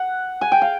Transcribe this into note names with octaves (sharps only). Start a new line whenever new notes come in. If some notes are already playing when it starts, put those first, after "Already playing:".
Already playing: F#5
G#5
G5
F5